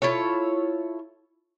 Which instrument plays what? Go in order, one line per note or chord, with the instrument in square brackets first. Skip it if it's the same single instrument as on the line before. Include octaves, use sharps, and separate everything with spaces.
[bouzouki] E4 F4 A4 C#5